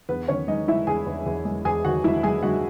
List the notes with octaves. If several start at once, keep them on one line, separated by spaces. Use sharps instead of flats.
E2 B3 B4
D#3 C#4 C#5
G#3 D#4 D#5
G#3 E4 E5
E2 G#4 G#5
E2
E2
G#3
E2 G#4 G#5
D#3 F#4 F#5
G#3 E4 E5
G#3 G#4 G#5
G#3 F#4 F#5